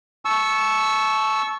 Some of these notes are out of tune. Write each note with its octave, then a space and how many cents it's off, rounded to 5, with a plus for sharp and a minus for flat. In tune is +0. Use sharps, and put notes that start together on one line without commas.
A5 -25 C#6 +0 E6 +0